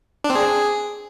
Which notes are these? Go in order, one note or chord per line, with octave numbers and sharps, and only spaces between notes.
D4
C4
G#4